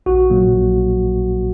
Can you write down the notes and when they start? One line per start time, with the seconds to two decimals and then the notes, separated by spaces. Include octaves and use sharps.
0.06 A#1 F#4
0.30 A#2 F#3 A#3
0.52 A#1